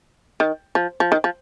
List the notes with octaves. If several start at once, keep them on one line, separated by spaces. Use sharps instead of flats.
D#3
F3
F3
D#3
F3